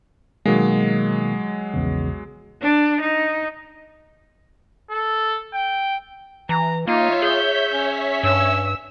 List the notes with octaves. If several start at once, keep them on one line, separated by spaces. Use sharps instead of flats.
B2 D#3 F#3 G#3 A#3
A#1 E2 C#3
D4
D#4
A4
G5
E3 A#5
A#3 D#4 F4 C#5 E5 B6
G#4 G6
C#4
G2 E6